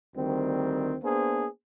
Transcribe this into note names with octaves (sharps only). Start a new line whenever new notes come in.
D2 D#3 G3 C4
A#3 B3 D4 G#4 C5